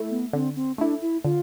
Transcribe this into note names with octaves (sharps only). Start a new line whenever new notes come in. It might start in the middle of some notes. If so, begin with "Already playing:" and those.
Already playing: A3 E4
B3
D3 C4
C4
A3 D4 E4
E4
D3 F4